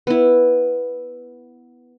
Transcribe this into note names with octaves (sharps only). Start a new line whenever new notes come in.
B3 E4